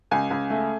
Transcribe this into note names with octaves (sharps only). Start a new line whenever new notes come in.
C#2 G#5
C#2
A3